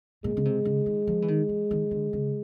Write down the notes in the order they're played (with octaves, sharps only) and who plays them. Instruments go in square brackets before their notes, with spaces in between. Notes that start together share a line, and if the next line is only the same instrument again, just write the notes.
[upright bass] A#2 [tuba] G#3
[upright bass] C#3
C3
C#3
D#3
F3
E3
D#3
E3
D#3
D3
C#3